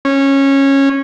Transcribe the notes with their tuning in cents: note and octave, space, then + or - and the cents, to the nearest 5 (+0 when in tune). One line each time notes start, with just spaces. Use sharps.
C#4 -15